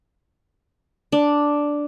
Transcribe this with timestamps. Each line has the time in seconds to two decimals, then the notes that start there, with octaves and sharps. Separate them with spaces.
1.12 D4